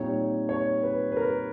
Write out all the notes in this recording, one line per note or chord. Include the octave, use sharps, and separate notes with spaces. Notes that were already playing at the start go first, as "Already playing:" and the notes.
Already playing: A#2 G3 C4 D#4 C#5
C#5
B4
B4
A#4